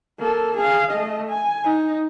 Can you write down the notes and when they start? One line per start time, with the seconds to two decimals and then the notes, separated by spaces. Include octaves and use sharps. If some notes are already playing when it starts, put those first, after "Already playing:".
0.19 A#3 A4
0.57 G#4 F5
0.92 A3 D#5
1.30 G#5
1.64 D#4